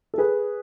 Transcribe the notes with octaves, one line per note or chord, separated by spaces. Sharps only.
A4
G#4 B4